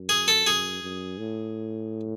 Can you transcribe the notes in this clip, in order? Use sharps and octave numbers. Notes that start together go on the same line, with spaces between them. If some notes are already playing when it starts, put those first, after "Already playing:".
Already playing: F#2
G#4
A4
F#2 G#4
F#2
A2